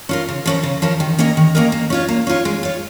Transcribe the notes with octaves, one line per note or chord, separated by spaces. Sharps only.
C#4 F4 A#4
C#3
F3 C#4 A#4
C#3
F3 C#4 A#4
D#3
A#3 C#4 A#4 D#5
D#3
A#3 C#4 A#4 D#5
A#3
C#4 F4 C#5
A#3
C#4 F4 C#5
G#3
F4 C#5